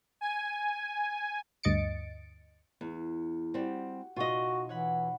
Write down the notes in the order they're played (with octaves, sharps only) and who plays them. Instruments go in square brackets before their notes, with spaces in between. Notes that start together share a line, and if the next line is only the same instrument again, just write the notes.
[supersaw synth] G#5
[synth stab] D2 G2 D#5 A6 C#7 D7
[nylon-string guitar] E2
[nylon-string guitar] G3 C4 [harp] F#4 G4
[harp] B2 D#4 [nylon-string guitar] F4 D#5 [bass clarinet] F#4
[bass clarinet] E3 [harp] C#5 F#5 B5